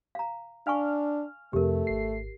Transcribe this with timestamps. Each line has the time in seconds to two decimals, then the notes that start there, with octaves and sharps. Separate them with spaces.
0.15 F5 A#5
0.67 D4 F5 G#5 C#6 F6
1.53 F2 C3 A3 G4 A#4
1.87 G#1 C7